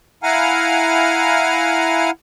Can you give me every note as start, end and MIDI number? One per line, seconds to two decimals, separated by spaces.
0.23 2.10 64
0.23 2.10 77
0.23 2.10 78
0.23 2.10 80
0.23 2.10 82
0.23 2.10 89